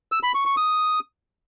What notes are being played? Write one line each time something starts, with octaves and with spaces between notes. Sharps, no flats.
E6
B5
C#6
C#6
D#6